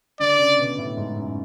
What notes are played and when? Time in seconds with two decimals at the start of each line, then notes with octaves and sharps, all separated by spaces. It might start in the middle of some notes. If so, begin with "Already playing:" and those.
0.20 D3 D5
0.39 C#3
0.59 B2
0.78 A2
0.97 G#2
1.16 F#2